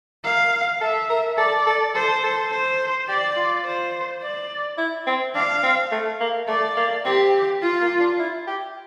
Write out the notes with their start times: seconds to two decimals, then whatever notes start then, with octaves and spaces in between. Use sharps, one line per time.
0.24 A#4 F5
0.81 A4 E5
1.10 A#4
1.38 A4 D5
1.67 A4
1.95 A4 C5
2.23 A4
2.51 C5
3.08 G4 D5
3.37 F4
3.65 C5
4.22 D5
4.78 E4
5.07 C4
5.35 D4 F5
5.63 C4
5.92 A3
6.20 A#3
6.48 A3 D5
6.77 A#3
7.05 C4 G4
7.62 F4
7.81 A#3
8.00 D4
8.19 E4
8.47 G4